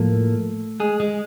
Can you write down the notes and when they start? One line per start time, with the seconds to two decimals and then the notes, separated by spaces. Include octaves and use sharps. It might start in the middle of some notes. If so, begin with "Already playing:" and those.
Already playing: A2 F3 A3 A#3 A4
0.80 G#3 G#4
1.00 G#3 G#4